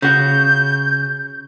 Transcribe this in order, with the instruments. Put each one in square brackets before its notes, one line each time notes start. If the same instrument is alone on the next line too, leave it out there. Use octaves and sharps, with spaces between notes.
[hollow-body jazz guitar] C#3 F#4 [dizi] G6